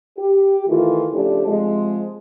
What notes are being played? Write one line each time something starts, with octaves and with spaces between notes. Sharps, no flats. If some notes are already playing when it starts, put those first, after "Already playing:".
G4
D#3 E3 A3 F4
C#3 F3 A3 D4 G4
C3 F3 G#3